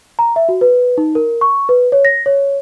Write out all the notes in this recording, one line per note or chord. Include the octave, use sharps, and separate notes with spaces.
A#5
E5
F#4
B4
D#4
A#4
C#6
B4
C#5
A#6
C#5